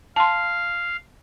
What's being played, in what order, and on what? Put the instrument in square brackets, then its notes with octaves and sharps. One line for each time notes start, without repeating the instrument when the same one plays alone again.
[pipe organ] F5 [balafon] A5 C6